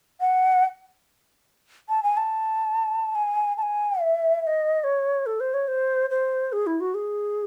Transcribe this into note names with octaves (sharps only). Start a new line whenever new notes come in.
F#5
A5
G#5
A5
G#5
A5
G#5
E5
E5
D#5
C#5
A4
C5
C#5
C5
C5
G#4
E4
F#4
G#4